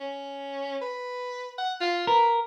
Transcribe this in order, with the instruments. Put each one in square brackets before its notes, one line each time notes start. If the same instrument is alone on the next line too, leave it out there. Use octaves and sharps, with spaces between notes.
[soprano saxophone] C#4
B4
F#5
F4
[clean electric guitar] A#4 [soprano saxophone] B4